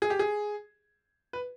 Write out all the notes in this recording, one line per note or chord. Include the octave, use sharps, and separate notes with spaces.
G#4
G4
G#4
B4